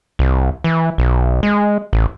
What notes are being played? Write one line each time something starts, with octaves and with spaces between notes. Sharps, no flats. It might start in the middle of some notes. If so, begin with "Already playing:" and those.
C2
E3
B1
G#3
A1